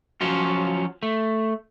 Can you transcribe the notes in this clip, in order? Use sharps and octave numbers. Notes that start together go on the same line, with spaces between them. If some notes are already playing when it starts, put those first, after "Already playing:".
F3 F#3 C#4 F4 F#4
A3